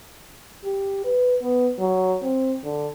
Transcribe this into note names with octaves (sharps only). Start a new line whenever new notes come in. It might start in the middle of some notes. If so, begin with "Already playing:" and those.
G4
B4
B3
F#3
C4
D3